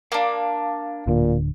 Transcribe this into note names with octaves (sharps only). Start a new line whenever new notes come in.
A#3 D4 F5
D1 A#2 D3